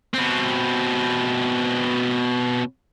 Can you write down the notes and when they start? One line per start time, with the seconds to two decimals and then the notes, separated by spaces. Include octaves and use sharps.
0.14 B2 C4